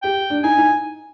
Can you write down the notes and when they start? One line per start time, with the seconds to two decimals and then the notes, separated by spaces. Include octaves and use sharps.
0.03 G4 G5
0.30 D4
0.44 D#4 G#5
0.57 D#4